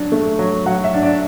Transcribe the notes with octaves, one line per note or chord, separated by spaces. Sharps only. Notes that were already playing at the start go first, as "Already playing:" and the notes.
Already playing: F#3 D4
A3
F#3
F#3 F#5
E5
D4
D5